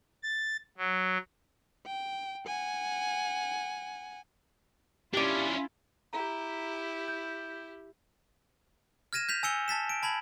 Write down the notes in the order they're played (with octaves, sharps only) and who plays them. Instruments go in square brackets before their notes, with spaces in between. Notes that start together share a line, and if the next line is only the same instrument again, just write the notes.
[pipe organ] A6
F#3
[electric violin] G5
F#5 G#5
[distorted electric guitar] C#4 D4 [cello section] E4 F4 [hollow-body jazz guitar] G4 D5
[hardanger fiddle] E4 G4 [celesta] A#5
[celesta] G6
[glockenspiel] F6 G#6 A#6 D#7 E7
G6 B6 F7
G#5 E6 C#7 G7
A5 A6 B6 E7
D7
A5 B5 G#6 F#7